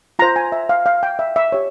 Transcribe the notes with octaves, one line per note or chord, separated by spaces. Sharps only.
F4 C5 A#5
G#5
E5
F5
F5
G5
E5
E5
G4 C#5